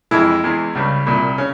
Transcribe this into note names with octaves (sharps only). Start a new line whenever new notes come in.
F2 E3 G#3 E4
E2 E3 G#3
C#2 C#3 G3
C2 A#2 G3
C#3 C#4